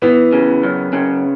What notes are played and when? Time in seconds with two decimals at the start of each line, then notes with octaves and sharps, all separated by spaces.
0.02 E3 B3
0.33 C#3
0.63 F#2
0.93 C#3